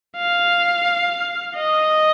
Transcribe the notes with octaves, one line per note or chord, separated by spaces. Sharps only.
F5
D#5